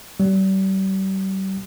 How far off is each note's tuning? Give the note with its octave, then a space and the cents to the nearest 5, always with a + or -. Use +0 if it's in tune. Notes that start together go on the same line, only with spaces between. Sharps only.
G3 -35